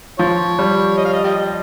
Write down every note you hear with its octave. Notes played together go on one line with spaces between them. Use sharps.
F3 F4 C#5
G3
D#5
F5
D#5
G4 D#5